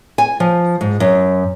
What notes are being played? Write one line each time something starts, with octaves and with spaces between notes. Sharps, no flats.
G#5
F3
G#2
F#2